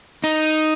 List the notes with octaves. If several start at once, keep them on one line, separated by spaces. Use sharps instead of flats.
D#4